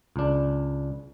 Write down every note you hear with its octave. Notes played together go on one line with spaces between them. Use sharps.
C#2 D4